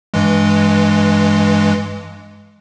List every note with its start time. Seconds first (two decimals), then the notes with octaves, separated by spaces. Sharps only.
0.14 G2 E3 G#3